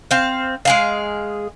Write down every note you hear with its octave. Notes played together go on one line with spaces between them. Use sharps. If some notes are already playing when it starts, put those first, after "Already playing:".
C4 F5
G#3 G#4 F5